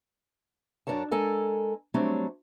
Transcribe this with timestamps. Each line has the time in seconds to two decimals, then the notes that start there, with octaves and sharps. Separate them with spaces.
0.87 F#2 D4 A#4 C#5 A5
1.11 G#3 A4 A#4 G#5
1.94 F#3 G3 A3 C4 D4 C#5